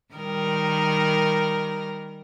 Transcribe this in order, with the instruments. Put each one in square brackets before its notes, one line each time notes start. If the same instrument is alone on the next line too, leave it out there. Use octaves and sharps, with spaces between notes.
[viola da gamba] D#3 G3 A#4